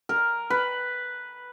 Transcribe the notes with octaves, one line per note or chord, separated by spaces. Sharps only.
A#4
B4